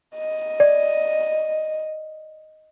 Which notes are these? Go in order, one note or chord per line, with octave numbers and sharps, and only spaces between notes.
D#5
D5